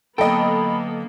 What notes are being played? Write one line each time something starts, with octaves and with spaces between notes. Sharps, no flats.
D3 F#3 A#3 B3 A4 D#5 G5 B5